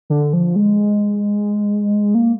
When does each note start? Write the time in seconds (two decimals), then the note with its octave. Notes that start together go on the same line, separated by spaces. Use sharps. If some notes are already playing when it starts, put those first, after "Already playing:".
0.10 D3
0.33 F3
0.56 G#3
2.15 A#3